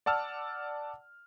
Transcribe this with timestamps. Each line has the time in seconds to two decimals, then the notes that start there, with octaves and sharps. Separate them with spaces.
0.06 D5 F#5 A5 E6 F6